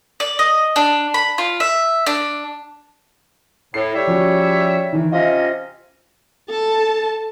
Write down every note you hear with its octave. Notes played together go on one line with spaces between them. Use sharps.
D5
D#5
D4
B5
F4
E5
D4
A2 C7
G3 C#5 E5
F3 C#4 F#4
D#3 E3
C3 C#4 F4 D#5
A4 A5